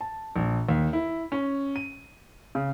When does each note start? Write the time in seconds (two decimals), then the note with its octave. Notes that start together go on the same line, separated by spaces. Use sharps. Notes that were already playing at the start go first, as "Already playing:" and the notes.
0.01 A5
0.36 A#1
0.69 D#2
0.93 E4
1.32 C#4
1.76 D#7
2.55 C#3